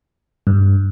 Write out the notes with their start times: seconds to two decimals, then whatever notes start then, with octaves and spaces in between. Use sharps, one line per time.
0.47 G2